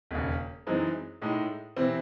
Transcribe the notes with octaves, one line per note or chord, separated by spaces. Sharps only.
E1 D#2 C#3
F#2 E3 G#3 C4 D#4
A2 G#3 D#4
C3 E3 C4 E4